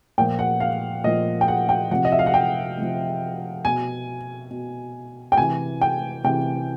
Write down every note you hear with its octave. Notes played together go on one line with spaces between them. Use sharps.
A#2 F3 G5
F#5
F5
A#2 F3 D#5
G5
F#5
G5
C3 F3 F#5
D#5
E5
F5
F#5
G5
C3 F3
B2 G#5
B2
G5
C3 E3 G#5
G5
C3 E3 G5